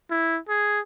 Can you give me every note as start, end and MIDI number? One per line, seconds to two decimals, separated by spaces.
0.10 0.39 64
0.49 0.80 68